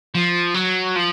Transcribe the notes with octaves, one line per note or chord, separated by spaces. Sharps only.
F3
F#3
F3